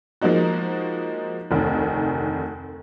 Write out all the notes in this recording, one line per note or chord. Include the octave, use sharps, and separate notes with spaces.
F3 G#3 A#3 D#4 F#4
F1 D2 D#3